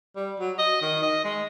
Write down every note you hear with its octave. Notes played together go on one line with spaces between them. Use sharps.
G3
F#3
D#5
D#3
D#5
G#3